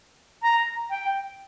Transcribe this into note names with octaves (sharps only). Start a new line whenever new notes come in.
A#5
G5